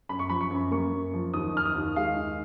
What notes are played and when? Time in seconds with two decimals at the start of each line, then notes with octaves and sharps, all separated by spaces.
0.09 F#2 B5
0.19 C#6
0.30 F3 B5
0.41 C#6
0.51 F#2
0.71 A#3 C#6
0.93 F#2
1.14 F3
1.34 D#2 D#6
1.54 D#3 F6
1.66 D#6
1.75 D#2
1.96 G#3 F5
2.17 D#2